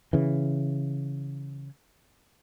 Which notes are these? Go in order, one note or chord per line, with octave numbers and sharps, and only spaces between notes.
C#3 E3